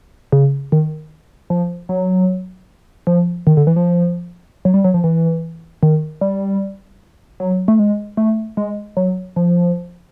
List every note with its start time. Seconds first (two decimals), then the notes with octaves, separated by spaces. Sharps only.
0.32 C#3
0.72 D#3
1.50 F3
1.89 F#3
3.07 F3
3.47 D#3
3.57 D3
3.67 E3
3.76 F3
4.65 F#3
4.74 G3
4.84 F#3
4.94 F3
5.04 E3
5.83 D#3
6.21 G3
7.40 F#3
7.68 A3
7.79 G#3
8.17 A3
8.57 G#3
8.97 F#3
9.36 F3